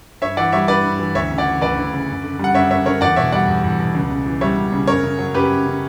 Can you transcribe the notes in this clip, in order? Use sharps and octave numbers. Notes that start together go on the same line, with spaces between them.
G2 C#5 E5
E3 D5 F#5
G3 C#5 E5
G2 B4 D5
G2
E3
D2 C#5 E5
C#3
D5 F#5
E3
D2 B4 D5
D2
C#3
F#2
D3
G3 F#5
F#2 C#5 E5
F#2 C#5 E5
D3 A#4 C#5
E2 D5 F#5
B2 C#5 E5
G3 D5 F#5
E2
E2
B2
C#2
C#3
E3
G3 C#5 E5
C#2
C#3
F#2 A#4 C#5
C#3
F#3
F#2 G4 B4
F#2
C#3